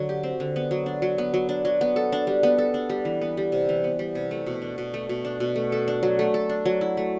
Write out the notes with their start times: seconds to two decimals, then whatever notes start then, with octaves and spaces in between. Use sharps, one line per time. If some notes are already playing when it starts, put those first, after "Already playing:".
Already playing: D3 F#3
0.09 G4
0.23 C4
0.40 D3
0.56 B3
0.71 F#3
0.86 D4
1.02 F#3
1.18 B3
1.34 F#3
1.49 D4
1.65 F#3
1.81 B3
1.96 A4
2.12 D4
2.27 G3
2.43 B3
2.58 A4
2.74 D4
2.89 G3
3.05 E3
3.21 B3
3.37 G3
3.52 C3
3.69 E3
3.84 B3
3.99 G3
4.15 C3
4.31 A3
4.46 B2
4.62 D4
4.78 B2
4.94 A3
5.09 B2
5.25 D4
5.40 B2
5.56 A3
5.72 A4
5.88 D4
6.03 F#3
6.19 A3
6.34 A4
6.49 D4
6.65 F#3
6.81 E4
6.97 A3